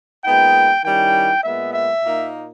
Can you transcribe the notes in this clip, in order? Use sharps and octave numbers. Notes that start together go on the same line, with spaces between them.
A#2 G#3 B3 D#4 G5
D#3 G3 C#4 E4 G5
A#2 G#3 B3 E5
E5
A#2 A#3 D#4